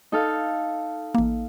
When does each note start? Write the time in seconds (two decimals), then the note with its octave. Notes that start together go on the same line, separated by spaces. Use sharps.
0.12 D#4 A4 F5
1.15 A1 A#3